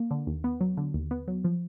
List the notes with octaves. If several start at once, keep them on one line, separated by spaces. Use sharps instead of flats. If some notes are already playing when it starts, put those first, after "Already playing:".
Already playing: A#3
D3
D#2
B3
F#3
D3
D#2
B3
F#3
F3